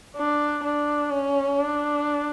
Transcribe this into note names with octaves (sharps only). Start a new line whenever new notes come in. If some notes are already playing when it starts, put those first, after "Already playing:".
D4
D4
C#4
D4